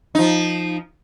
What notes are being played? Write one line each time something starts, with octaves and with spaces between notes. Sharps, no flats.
F3 D#4